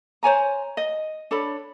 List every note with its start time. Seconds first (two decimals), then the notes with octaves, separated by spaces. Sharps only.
0.23 C5 C#5 G#5 A#5
0.77 D#5
1.31 D4 A4 C#5 B5